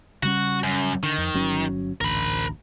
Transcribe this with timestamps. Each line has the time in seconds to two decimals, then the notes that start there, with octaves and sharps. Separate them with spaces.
0.23 C#3 G3 C#4 F#4
0.64 F#2
1.03 D3 D#3
1.18 F2
1.34 G1 F#3 C#4
2.01 A1 D2 A#4 B5